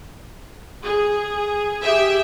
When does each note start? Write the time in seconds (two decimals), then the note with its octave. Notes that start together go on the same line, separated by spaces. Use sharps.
0.84 G#4
1.85 G4 G#4 E5 G5